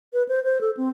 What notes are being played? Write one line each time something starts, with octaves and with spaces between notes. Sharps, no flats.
B4
C5
C5
A4
C4